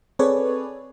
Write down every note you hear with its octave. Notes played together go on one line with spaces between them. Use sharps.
C4 G#4 A4 B4 C#5 D5